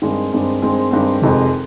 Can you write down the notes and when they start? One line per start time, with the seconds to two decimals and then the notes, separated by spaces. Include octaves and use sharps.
0.02 G2 D#3 G#3 C4
0.32 G2 D#3 G#3 C4
0.62 G2 D#3 G#3 C4
0.91 G2 D#3 G#3 C4
1.22 F1 F2 C3 D#3 G#3